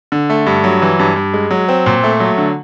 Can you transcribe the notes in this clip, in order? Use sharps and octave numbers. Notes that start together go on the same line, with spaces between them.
D3
A3
G2
F#3
E3
G2
G2
G#3
F#3
C4
A#2
A3
F#3
D3